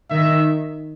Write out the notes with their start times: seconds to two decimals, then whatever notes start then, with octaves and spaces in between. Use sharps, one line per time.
0.10 D#3 E5